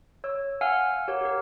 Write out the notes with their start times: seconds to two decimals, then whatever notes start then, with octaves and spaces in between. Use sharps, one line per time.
0.24 C#5 E6
0.61 F5 F#5 G#5 E6 F6
1.08 G4 A#4 C#5 F#5
1.21 G4 A#4